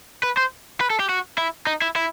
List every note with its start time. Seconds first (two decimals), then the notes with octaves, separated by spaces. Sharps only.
0.23 B4
0.37 C5
0.81 B4
0.90 A4
1.00 G4
1.09 F#4
1.38 E4
1.67 D#4
1.82 E4
1.96 E4